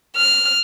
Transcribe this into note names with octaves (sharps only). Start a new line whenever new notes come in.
F6